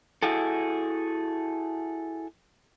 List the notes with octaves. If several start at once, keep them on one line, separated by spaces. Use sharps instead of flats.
E4 F#4 G#4 A4